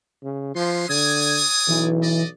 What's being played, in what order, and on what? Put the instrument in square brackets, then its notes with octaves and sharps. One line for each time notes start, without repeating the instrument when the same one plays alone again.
[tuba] C#3
[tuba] F3 [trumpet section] B3 C#4 C6
[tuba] D3 [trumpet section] D5 G#5 D#6 [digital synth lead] G#6
[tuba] B1 [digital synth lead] E3
[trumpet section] D5 D#5